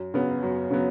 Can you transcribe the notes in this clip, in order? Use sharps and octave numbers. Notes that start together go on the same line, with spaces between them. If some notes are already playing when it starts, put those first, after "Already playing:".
Already playing: F#2
C#3 F#3 B3
F#2
C#3 F#3 B3